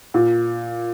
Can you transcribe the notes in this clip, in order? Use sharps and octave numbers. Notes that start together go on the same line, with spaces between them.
A#2